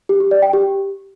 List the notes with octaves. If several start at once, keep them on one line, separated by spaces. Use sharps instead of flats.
G4
G4
D5
G5
G4